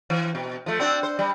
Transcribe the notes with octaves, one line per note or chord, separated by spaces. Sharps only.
E3
B2
F3 A3
C4 D4 F#4
C5
G3